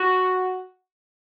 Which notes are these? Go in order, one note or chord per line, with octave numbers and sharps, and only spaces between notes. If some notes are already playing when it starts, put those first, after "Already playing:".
Already playing: F#4